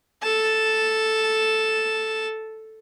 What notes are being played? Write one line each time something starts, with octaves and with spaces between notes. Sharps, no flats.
A4 A5